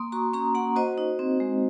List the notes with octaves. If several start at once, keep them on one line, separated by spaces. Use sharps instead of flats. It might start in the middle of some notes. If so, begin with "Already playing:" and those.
Already playing: A#3 C6 D#6
F#4 A#5 C#6
C#4 A#5 C#6
A#3 F#5 A#5
F#4 C5 D#5
D#4
C4
G#3